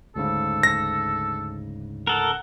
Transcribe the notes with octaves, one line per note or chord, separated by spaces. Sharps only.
D2 G#2 C#3 A4
A#6
A4 A#4 F#5